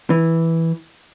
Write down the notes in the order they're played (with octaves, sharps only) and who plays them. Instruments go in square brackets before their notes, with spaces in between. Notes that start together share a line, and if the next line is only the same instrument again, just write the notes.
[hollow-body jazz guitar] E3